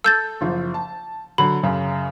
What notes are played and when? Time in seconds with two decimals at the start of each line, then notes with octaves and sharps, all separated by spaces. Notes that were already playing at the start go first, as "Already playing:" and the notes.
0.04 A4 E6 G6 A6
0.41 F#1 F3
0.74 A5
1.38 D3 F#3 B5
1.63 F#2 C#3